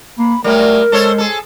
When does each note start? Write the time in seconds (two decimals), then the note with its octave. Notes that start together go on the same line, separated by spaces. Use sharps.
0.19 A#3 B5
0.44 F#3 G3 A3 A#4
0.92 G#3 A4 C5 C#5
1.18 G#4 A4